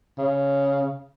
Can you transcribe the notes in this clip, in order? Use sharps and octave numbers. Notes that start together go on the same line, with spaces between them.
C#3